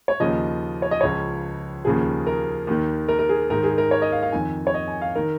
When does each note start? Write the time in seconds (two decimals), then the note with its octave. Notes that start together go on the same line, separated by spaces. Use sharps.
0.08 C#5
0.20 D#2 C#3 F3 D#5
0.82 C#5
0.91 D#5
1.01 C#2 C#3 F3 C#5
1.85 D#2 C#3 F3 G#4
2.27 A#4
2.67 D#2 D#3
3.09 A#4
3.19 A#4
3.29 G#4
3.50 G#2 D#3 A#4
3.64 G#4
3.78 A#4
3.91 C#5
4.02 D#5
4.12 F5
4.22 F5
4.32 F2 D#3 G#5
4.67 C#5
4.74 D#5
4.88 G#5
5.02 F5
5.15 D#3 A#4